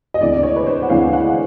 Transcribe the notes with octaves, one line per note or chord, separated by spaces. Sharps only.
D#5
D2 C3 E3 G#3 D5
D5
C#5
B4
C5
F#5
D2 C3 E3 G#3 F5
F#5